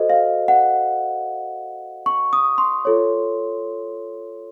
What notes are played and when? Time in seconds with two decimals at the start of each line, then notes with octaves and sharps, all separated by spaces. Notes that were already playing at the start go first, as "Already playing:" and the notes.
Already playing: F#4 A4 C5 D#5
0.10 F5
0.48 F#5
2.06 C#6
2.33 D#6
2.58 C6
2.85 F4 A4 C#5